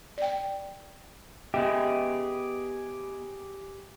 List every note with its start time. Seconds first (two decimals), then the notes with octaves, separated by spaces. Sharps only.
0.18 D5 G5
1.54 B3 G4 G#4 D#5 E5